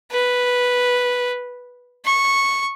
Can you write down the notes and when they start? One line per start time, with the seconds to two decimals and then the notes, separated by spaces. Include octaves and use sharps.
0.11 B4
2.05 C#6